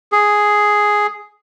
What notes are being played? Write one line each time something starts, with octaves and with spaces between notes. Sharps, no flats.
G#4